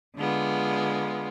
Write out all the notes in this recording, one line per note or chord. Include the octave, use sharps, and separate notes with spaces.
D3 G#3 B3 F4